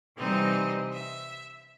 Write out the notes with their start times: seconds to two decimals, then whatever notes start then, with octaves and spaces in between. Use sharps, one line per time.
0.17 C3 E3 G3 C4 D#4 D#5
0.92 E5